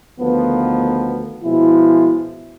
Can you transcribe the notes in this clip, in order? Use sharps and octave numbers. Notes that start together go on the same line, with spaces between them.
D2 D#3 F3 B3
B2 F3 G#3 E4